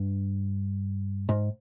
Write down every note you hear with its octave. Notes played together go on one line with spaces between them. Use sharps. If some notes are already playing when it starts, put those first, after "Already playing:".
Already playing: G2
G#2